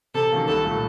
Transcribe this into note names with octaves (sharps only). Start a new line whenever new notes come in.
C3 A4
D#3 F#3 A#3 C#4
C2 A4
A#2 A3